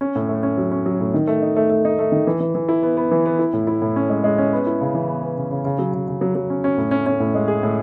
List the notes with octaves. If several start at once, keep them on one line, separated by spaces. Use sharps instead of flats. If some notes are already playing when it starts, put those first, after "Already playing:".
C#4
A2
A3
C#4
F#3
C#4
F#3
A2
D#3
A3
D#4
A3
A3
D#4
A3
D#3
E3
E3
E3
E4
B3
B3
E3
B3
E4
A2
E4
A2
C#4
G#3
G#3
C#4
B3
E4
C#3
E3
B3
B3
C#3
C#3
C#3
F#3
C#3
C#3
F#3
F#3
C#4
C#4
A2
C#4
C#4
A2
G#3
G#4
A2